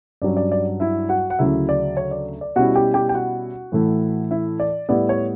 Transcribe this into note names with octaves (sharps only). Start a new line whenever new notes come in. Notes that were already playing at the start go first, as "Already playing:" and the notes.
G2 F#3 C#4 D5
D5
D5
E4 E5
F#4 F#5
F#5
D2 C#3 F#3 E4 E5
D5
C#5
D5
D5
B2 G3 C#4 E4 F#4 F#5
G4 G5
G4 G5
G5
F#4 F#5
A2 E3 A3 E4
E4 E5
D5
A2 G3 B3 E4 D5
C#5